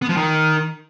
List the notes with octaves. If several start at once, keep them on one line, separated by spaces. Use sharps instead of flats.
B3
F3
D#3